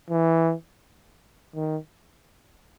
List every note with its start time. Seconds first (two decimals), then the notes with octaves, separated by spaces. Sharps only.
0.10 E3
1.55 D#3